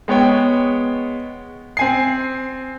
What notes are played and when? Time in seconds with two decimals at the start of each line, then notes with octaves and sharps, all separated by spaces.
0.08 G#3 B3 C#5 G5
1.77 C4 G#5 C7